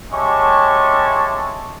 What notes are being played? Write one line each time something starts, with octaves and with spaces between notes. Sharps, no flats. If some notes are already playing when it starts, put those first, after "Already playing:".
G#3 C#4 G4 E5 A5 C#6